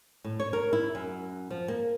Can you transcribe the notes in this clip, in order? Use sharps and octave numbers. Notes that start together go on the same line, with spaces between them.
A2
C#5
A#4
E4
F#2
F3
A#3